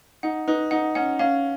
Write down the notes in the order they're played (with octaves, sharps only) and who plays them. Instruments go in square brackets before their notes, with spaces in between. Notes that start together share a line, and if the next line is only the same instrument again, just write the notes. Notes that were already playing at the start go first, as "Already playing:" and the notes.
[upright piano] D#4 [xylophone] F#5
[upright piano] D#4 [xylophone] B4
[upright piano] D#4 [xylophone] F#5
[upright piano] C#4 [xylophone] F#5
[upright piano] C#4 [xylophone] F5